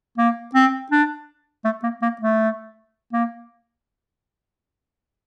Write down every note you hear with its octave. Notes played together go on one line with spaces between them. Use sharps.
A#3
C4
D4
A3
A#3
A#3
A3
A#3